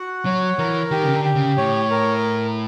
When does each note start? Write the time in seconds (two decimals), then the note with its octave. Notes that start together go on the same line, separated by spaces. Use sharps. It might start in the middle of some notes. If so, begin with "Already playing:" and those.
Already playing: F#4 F#5
0.25 F#3 C#5
0.59 E3 A#4
0.91 D#3 G4
1.04 C#3
1.13 D3
1.24 G4
1.35 C#3
1.57 A2 C#5
1.90 A#4